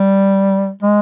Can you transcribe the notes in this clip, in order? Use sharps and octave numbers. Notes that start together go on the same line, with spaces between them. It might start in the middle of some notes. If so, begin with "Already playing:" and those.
Already playing: G3
G#3